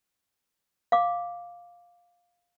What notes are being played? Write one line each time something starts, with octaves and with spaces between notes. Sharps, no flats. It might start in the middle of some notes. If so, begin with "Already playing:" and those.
F5 D6